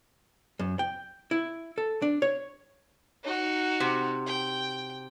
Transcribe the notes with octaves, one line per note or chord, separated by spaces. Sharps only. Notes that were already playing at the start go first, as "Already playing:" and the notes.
F#2
G5
E4
A4
D4
C#5
D#4 F#4
C3
G5